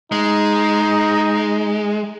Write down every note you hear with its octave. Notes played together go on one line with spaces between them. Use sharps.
G#3 D#4